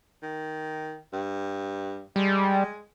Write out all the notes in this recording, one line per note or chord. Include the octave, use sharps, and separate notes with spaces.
D#3
G2
G3 G#3